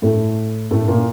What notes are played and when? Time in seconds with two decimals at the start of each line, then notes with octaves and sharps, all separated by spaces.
0.02 A2 A3
0.71 A2 A3
0.88 A#2 A#3